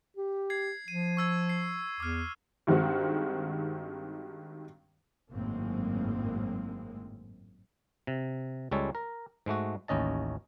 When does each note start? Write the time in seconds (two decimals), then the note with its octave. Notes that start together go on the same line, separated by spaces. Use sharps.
0.17 G4
0.50 G#6 C7
0.88 F3 D#7
1.17 C#6 E6 G#6
1.49 C7
2.00 E2 D6 F6
2.67 G2 D#3 G#3 C4 F#4
5.32 G#1 F#2 A2 G#3 A#3 C4
8.07 C3
8.71 C#2 G3 G#3 A4 C#5
8.95 A#4
9.46 G#2 G#3 A3 F#4
9.88 A1 D#2 C#4 D#5 A5